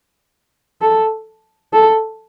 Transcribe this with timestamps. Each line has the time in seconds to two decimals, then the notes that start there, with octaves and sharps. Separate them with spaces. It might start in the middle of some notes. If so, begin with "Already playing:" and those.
0.82 A4
1.73 A4